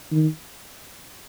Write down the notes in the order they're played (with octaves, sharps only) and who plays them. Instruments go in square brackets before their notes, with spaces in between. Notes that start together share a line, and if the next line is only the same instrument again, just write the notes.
[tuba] D#3